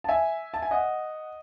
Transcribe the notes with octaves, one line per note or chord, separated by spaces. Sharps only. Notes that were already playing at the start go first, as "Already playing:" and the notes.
A5
E5 G#5
A5
G#5
D#5 F#5